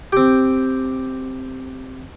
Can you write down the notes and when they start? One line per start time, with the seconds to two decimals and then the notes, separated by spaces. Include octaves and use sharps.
0.13 C4 G4